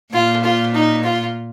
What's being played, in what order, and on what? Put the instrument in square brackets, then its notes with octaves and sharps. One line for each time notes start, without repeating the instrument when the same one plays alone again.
[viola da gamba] A#2 [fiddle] F4
[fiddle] F4
D#4
F4